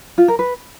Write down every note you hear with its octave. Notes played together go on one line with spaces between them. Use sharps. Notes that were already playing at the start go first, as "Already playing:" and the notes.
F4
A#4
B4